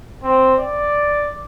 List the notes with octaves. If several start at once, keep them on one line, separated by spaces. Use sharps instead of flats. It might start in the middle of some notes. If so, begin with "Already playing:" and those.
C4
D5